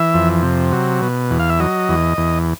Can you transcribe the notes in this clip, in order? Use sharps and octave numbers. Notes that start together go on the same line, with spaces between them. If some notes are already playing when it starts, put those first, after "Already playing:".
Already playing: E3 E5
F2
C3
F#3
B2
E2
F5
E5
F#3 D#5
E2
E2